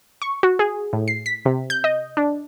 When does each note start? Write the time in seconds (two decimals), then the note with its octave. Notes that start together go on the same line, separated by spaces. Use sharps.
0.22 C#6
0.43 F#4
0.59 G#4
0.93 A2
1.08 C7
1.26 B6
1.45 C3
1.70 G6
1.84 D#5
2.17 D4